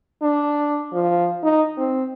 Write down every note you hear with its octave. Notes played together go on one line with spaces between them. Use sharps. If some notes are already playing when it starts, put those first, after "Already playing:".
D4
F3
D#4
C4